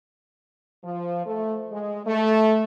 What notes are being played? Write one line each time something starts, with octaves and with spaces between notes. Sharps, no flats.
F3
A3
G#3
A3